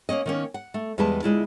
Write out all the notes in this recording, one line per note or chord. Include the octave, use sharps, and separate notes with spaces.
A#3 C4 C#4 D#5
D#3 A#3 C#4
F#5
A3
E2 G3 G#3 B4 A5
D2 G#3 E4 F4